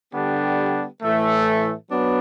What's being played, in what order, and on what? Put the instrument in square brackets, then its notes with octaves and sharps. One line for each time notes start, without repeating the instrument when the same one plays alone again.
[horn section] D3 G3 B3 D4 G4
A2 E3 A3
F#3 B3 D4